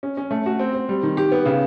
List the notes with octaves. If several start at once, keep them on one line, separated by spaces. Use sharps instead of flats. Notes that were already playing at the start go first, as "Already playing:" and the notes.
C#4
C#4
A3
F#4
C4
C4
G3
D#3
G4
B3
C#3